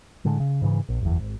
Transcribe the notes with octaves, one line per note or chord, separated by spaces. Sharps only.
A2 D3 G#3
C#3
G#2 C#3 E3
A#1
F#1 E2
G#1